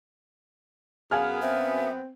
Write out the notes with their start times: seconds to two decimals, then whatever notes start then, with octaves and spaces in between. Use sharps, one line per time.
1.11 F#2 B3 G#4 F5 G#5 F6
1.42 C4 E5